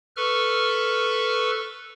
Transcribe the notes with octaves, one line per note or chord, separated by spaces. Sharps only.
A4 B4 C#6 F6